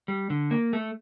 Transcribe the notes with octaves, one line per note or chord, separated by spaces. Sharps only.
G3
D3
A#3
A3